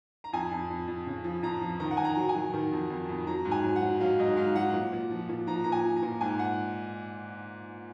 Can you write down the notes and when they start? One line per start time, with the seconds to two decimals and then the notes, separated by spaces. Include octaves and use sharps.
0.24 A#5
0.33 F2 G#5
0.51 F2
0.70 F2
0.88 F2
1.07 C#3
1.24 F3
1.43 F2 A#5
1.61 F3
1.80 D#3 A#5
1.91 F#5
1.97 D#3 G#5
2.05 A#5
2.17 F#3
2.29 G#5
2.35 F#3
2.54 D#3
2.72 F2
2.90 F2
3.09 F2
3.27 F#3 A#5
3.45 G#2
3.51 G#5
3.64 F#3
3.76 F#5
3.81 F#3
4.00 F#3 F5
4.19 G#2 D#5
4.37 G#2 F5
4.56 F#3 F#5
4.73 A#2
4.92 A#2
5.11 F3
5.29 A#2
5.47 F3 A#5
5.64 A#2 A#5
5.72 G#5
5.84 F3
5.96 A#5
6.02 A#2
6.21 G#2 G#5
6.39 F#5